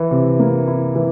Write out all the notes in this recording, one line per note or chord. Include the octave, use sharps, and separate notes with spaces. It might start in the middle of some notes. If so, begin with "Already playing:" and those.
Already playing: E3 E4
C3
A#3
E4
E3